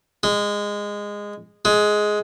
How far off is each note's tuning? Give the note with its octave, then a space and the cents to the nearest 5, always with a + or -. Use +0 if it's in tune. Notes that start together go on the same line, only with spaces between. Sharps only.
G#3 -15
G#3 +10